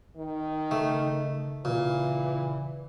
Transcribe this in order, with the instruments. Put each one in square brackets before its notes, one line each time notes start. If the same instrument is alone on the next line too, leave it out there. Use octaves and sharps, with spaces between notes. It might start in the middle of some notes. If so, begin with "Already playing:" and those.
[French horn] D#3
[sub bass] C#3 [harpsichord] A3
[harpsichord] A#2 [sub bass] C#3 [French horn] E3